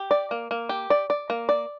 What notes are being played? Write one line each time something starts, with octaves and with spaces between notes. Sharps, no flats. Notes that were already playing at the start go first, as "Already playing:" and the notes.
Already playing: G4
D5
A#3
A#3
G4
D5
D5
A#3
D5